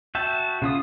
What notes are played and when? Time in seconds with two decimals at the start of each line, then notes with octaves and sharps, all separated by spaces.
0.15 F#4 E5 G5 A5
0.62 C#3 F4 D#6